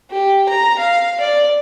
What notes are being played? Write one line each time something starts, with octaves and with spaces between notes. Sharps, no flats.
G4
A#5
F5
D5